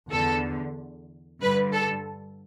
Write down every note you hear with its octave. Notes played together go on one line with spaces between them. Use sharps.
E2 D3 A4
G2 D3 B4
A4